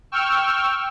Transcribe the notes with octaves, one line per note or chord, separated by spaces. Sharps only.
G5 C#6 E6 F6